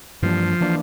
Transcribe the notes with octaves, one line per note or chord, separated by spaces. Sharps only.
G2 E3 F3 A#3 D4
E3 A#3 D4